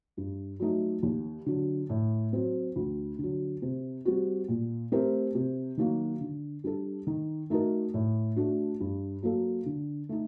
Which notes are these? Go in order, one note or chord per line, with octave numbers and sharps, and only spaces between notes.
G2
F#3 A3 D#4
D#2
D3 F#3
A2
F#3 C4
D2
D3 F#3
C3
G3 C4 F#4
A#2
A3 C4 G4 A#4
C3
D#3 F#3 A#3 F#4
D3
G3 D4 A4
D#3
A3 D#4 F#4 A#4
A2
A3 D4 F#4
G2
F#3 A#3 F#4 A4
D3
A3 D#4